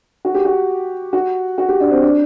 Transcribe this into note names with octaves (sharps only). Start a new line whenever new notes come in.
F#4
G4
F#4
F#4
F#4
G4
D4
C4
D4